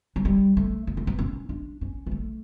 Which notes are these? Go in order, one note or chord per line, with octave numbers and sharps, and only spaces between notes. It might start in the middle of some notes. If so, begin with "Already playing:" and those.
F#3
G3
A3
B3
A3
B3
C#4
D4
C#4
B3
A3